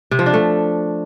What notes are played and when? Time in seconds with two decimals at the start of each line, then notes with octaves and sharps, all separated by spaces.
0.11 C3
0.19 F3
0.26 D4
0.34 A3